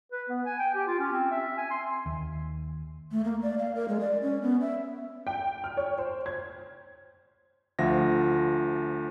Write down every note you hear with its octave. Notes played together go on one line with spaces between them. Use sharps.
B4
B3
G#5
G5
G4
F4
C#4
C4
E5
G#5
C6
D#2
A3
A#3
D5
F5
A#4
G#3
D5
C#4
B3
E5
G5
F6
C#5
C5
G#6
D2 F3 F4 E5 F#5 A#6